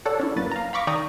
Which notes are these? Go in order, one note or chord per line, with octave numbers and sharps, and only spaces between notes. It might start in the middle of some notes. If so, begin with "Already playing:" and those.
A4 C#5 D5 F#5
C#4 D4 E4
F#2 A#3 B4 A6
F5 A#5
F5 B5 C#6 D6 A#6 B6
D#3 D5 G5 A#5 C#6 D#6